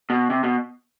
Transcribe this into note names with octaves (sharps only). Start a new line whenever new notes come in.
B2
C3
B2